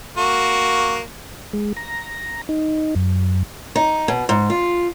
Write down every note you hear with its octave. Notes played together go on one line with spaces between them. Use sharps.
A#3 F#4
G#3
A#5
D#4
F#2
D#4
B2
G#2
F4